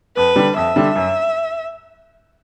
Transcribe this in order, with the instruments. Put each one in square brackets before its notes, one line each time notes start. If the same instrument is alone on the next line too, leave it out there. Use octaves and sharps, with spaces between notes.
[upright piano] F2 [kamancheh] B4
[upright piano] D3 G3
[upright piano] F2 [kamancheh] E5
[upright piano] D3 G3
F#2